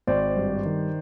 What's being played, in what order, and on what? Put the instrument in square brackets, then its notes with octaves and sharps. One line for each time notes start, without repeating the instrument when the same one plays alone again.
[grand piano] G#1 C5 D5
G2
D#3